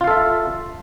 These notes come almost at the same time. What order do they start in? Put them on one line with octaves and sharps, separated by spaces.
F4 F5 A4 E5